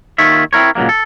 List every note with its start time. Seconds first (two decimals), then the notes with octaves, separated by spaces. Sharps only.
0.18 D#2 D#3 F4 C#5 E5
0.53 C4 E4 A#4 C#5
0.75 A#2 C#3 F#3 G#3 A#3
0.89 A4